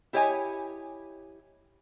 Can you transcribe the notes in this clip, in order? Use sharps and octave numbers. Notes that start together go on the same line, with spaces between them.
E4 G4 C#5 D#5 G#5